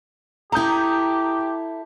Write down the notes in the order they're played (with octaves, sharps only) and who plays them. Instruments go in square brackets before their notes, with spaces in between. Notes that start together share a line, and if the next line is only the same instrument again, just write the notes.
[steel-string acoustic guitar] E4 A4 [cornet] G4 [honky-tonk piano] A#5 D#6 G6